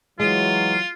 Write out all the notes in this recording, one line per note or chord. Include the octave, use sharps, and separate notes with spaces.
E3 F#3 G#3 F4